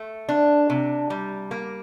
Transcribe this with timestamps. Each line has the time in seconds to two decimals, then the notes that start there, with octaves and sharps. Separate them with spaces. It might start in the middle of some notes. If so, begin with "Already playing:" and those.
Already playing: A3
0.29 D4
0.70 C3
1.10 G3
1.51 A#3